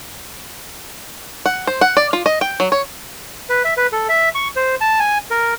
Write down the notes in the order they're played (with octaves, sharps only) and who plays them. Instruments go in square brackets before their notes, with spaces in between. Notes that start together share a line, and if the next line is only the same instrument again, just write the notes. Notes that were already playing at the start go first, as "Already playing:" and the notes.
[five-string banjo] F#5
C5
F#5
D5
F4
D#5
G5
F#3
C#5
[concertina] B4
E5
B4
A4
E5
C#6
C5
A5
G#5
A#4